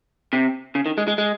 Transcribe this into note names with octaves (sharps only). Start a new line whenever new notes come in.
C3
C#3
D#3
G#3
G#3
G#3